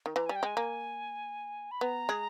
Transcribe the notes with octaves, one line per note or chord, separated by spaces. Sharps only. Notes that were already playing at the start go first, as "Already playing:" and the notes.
D#3
E3 A#5
G3 G#5
G5
G#3 G#5
A#3
B5
B3 A#5
G#3 G#4